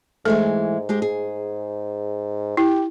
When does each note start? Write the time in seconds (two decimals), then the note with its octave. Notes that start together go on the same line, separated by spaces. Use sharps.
0.25 G#2 E3 G#3 A3 A4
0.89 G#3 G4 G#4
1.02 G#4
2.57 E4 G4